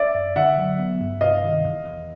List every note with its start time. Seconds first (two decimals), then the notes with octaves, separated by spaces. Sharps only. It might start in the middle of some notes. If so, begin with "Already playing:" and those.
Already playing: D5 E5
0.14 F#2
0.36 D3 E5 F#5
0.58 F#3
0.79 B3
1.00 G2
1.21 C3 D#5 F5
1.43 D#3
1.64 E2
1.85 E2